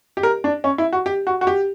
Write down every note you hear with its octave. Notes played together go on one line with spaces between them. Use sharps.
G4
A#4
D4
C#4
E4
F#4
G4
F#4
F#4
G4